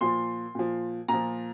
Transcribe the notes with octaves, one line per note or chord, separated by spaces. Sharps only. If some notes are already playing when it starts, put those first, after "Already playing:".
A#2 F3 C6
A#2 F3
A#2 F3 A#5